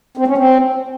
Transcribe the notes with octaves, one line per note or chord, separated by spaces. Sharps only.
C4
C#4
C4